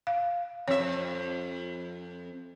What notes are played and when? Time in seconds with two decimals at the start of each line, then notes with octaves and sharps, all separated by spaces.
0.07 F5
0.68 F2 C#5 E5